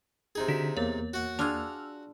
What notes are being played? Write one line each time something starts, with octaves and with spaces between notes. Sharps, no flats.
C3 D#4 G#4
D3 F#4 B6
E2 A#3 B3 C#5
F#4 F#5
D4 F4 G#4 E6 F6 F7